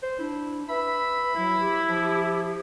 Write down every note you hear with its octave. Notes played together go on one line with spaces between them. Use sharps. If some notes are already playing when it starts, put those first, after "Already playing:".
C5
D4 E4
B4 E5 B5
F#3 E4
G4
F3